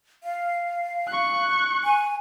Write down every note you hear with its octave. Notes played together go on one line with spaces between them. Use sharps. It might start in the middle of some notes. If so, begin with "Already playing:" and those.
F5
C#6 F#6
G#5